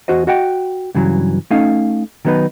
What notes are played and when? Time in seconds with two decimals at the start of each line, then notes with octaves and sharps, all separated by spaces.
0.08 E2 F#4 C5 D#5
0.27 F#4 D#5 F#5 G5
0.95 G2 C#3 E3 F#3
1.50 A3 C#4 D#4 F5
2.25 D#3 F#3 B3 D#4 B4